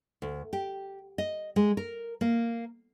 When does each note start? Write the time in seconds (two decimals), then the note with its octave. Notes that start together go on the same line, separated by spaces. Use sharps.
0.22 D2
0.53 G4
1.18 D#5
1.56 G#3
1.77 A#4
2.21 A#3